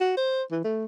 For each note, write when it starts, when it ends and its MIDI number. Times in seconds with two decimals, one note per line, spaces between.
0.01 0.14 66
0.17 0.43 72
0.52 0.61 52
0.64 0.86 57